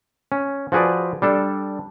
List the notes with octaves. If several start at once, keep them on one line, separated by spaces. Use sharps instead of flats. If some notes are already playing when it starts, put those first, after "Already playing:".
C#4
F3 F#4 G#4 B4 D5
G3 D4 A4